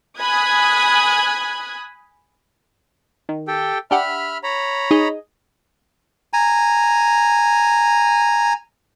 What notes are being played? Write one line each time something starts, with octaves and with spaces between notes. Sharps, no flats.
G#5 B5 D#6 F#6 G#6
D#3
G4 A4 G5
D4 G4 E5 F#5 B5 F6
C#5 A#5 B5
D#4 G#4 D#5
G#5 A#5